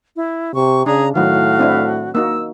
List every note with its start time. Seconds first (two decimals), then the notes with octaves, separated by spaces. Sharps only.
0.16 E4
0.54 C3 C#6
0.86 C#3 D4 G#4 A#5
1.15 A2 D#3 F#3 F#4 F5
1.59 C4 D4 E4
2.15 A#3 D#4 F#4 E6